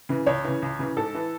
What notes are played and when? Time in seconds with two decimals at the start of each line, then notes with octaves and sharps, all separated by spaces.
0.09 C#3 E3
0.26 C#2 C#5
0.44 C#3 E3
0.62 C#2
0.79 C#3 E3
0.97 G#2 A4
1.15 E3